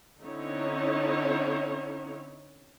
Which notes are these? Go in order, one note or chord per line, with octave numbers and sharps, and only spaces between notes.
D3 C4 C#4 D#4 E4 C#5